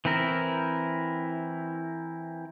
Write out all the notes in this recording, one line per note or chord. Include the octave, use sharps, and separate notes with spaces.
E3 C4 E4 A#4